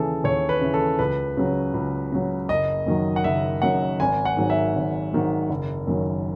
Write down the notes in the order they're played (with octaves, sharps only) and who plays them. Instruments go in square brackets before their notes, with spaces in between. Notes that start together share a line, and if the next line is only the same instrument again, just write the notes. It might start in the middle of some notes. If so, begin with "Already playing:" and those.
Already playing: [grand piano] D#2 C#3 E3 G#4 A4
D#2 C#5
B4
C#3 E3
A4
C#2 B4
C#3 F#3
C#2
C#3 F#3
F#1 D#5
F#2 D#3 F#3
F#5
F#1 E5
F#2 D#3 F#3 F#5
G#1 G#5
F#5
G#2 D#3 F#3
E5
G#1
G#2 D#3 F#3
F#1
F#2 D#3 F#3